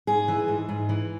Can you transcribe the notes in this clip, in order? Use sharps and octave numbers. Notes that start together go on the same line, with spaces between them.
G#2 G#4
E3
G#2
G#2
E3